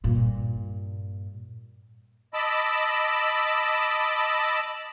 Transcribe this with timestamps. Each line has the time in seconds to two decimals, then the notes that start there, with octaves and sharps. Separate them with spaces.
0.04 G2 A#2
2.34 D#5 A5 B5 D6 E6